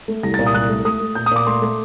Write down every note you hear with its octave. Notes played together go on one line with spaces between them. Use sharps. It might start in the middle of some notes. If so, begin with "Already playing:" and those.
A3
C2 A#6
A6
A#2
D#6
C2 F#6
A3
A3 D#6
A3
A#2 G6
D#6
A#2 D6
A3 C6
A3